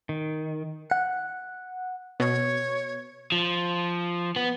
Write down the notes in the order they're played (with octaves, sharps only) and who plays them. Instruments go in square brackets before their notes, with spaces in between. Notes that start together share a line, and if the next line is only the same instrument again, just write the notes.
[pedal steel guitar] D#3
[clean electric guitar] F#5
[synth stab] B2 [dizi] C#5
[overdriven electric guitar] F3
B3